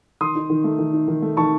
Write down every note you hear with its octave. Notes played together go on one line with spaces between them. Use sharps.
D#3 C6 D#6
D#4
D#3
A3
D#3
D#4
D#3
A3
D#3 A5 C#6